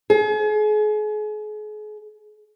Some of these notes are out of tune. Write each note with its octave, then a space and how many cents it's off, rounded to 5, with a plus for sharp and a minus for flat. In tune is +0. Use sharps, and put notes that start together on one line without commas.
G#4 +35